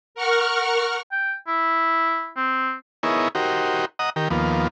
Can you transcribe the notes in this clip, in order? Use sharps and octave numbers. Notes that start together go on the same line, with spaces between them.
A#4 F#5 C#6 F6
G5
E4
C4
B3 D#4 E4 G#4 A#4 C#5
D#4 F#4 G4 A#4 C5
D#5 F#5 A#5 D#6
D#3 G4 A#4
D#2 F3 A#3 B3